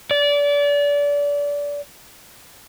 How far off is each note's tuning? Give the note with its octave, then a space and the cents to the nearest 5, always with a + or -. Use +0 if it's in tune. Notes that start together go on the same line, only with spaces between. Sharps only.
D5 -30